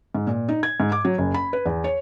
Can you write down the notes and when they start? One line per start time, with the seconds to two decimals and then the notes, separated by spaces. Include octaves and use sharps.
0.15 G#2
0.27 A#2
0.49 D#4
0.63 G#6
0.80 G#2
0.92 D6
1.05 F#3
1.18 F#1
1.34 B5
1.53 B4
1.66 E2
1.84 C#5